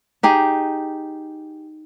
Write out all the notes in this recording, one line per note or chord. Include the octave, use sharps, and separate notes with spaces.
D#4 G4 G#4